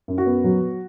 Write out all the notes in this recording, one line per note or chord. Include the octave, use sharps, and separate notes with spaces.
F#2
F#4
B3
F#3
F#3